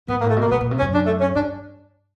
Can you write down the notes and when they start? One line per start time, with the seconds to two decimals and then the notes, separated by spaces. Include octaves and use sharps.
0.08 G#2 B3
0.20 A#3
0.23 A2
0.29 A3
0.36 B2 A#3
0.50 A#2 B3
0.61 A#2
0.71 C3
0.78 C#4
0.81 F#2
0.93 D4
1.06 A3
1.20 C#4
1.35 G2 D4